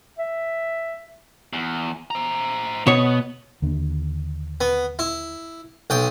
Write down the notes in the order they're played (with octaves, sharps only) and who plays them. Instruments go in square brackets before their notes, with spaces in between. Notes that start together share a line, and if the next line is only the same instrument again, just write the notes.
[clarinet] E5
[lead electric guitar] E2
C5 A#5
[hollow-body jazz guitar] B2 C#5 [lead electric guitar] B3
[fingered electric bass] D#2 D3
[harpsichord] B3
E4
B1 G5 D#6